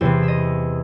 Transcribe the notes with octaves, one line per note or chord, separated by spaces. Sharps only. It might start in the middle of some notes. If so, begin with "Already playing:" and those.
E2 C3 E3 C5
E5
D#5